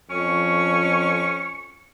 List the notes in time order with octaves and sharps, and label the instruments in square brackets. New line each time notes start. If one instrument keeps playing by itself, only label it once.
[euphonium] F2 [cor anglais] C#4 [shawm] C#6